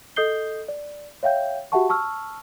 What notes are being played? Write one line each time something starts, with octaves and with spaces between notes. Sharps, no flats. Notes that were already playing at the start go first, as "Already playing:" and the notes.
A4 D#5 D#6 G6 C7 G7
D5
C#5 E5 F5 G5 G6
F#4 G4 E5 F#5 A5 C#6
A5 C#6 E6 F6